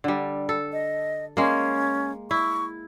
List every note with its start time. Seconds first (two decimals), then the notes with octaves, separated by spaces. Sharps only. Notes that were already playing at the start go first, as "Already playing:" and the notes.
0.04 D3 G3
0.49 A4
0.73 D#5
1.37 G#3 A#3 C#4
2.31 E4 C#6